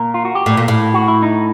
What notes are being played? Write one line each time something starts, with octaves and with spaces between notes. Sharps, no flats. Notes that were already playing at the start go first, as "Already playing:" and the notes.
Already playing: A#2 A#4
F4
F#4
G4
A2
A#2
A2
F#4
E4
D#4